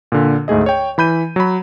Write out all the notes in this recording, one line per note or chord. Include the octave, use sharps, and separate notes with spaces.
A#2 D3
D2 G#2 A3 G#4 D#5
C#5 G5
E3 B5 G6 D#7
F#3 B5